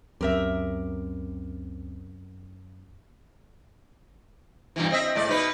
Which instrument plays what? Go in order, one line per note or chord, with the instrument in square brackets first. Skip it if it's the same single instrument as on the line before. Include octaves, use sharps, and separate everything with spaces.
[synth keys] C#2 C4 [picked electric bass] F#2 [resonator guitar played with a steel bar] G4 A#4 E5
[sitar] G2 B2 E3
C4 D#5 E5
A2 G#3 D5
B2 D#4 B4